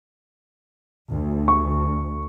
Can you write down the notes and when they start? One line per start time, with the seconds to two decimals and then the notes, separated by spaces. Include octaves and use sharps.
1.11 D2
1.48 C#6